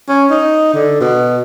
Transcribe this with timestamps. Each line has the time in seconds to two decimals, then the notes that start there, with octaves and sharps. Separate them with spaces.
0.09 C#4
0.30 D#4
0.74 D3
1.01 B2